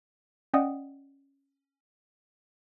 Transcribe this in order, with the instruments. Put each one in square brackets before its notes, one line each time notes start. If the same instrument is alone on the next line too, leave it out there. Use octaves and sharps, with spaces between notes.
[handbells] C#4 D5 D#5 F#5 G5 D#6